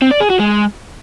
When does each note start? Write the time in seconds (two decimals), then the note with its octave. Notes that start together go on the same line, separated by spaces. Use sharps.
0.02 C4
0.11 D5
0.21 G#4
0.30 F#4
0.40 G#3